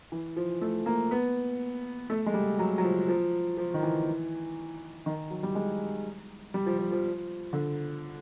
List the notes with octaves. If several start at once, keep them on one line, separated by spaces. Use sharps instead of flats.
E3
F3
A3
A#3
B3
A3
G#3
G3
F#3
F#3
F3
F3
F3
D#3
E3
D#3
F#3
G3
G#3
G3
F3
F3
F3
D3